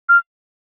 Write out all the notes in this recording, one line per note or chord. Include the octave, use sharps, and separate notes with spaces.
F6